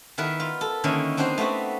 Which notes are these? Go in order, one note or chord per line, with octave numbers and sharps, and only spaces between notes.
D#3 B3 E4 A#4 B4
F4
A4
D3 D#3 A#3 C#4 D#4 E4
C4 D4 D#4 F#4 C5
A3 B3 C4 F#4